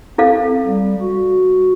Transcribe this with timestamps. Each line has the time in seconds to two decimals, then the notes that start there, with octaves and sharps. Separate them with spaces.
0.18 C4 E4 A4 F5
0.67 G3
1.01 F#4